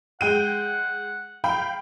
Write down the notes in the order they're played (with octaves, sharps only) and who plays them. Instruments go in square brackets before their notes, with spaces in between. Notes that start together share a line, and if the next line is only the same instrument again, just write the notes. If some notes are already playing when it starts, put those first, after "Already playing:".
[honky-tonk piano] G#3 G5 D#7 [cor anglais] F#5
[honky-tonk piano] F5 G5 B5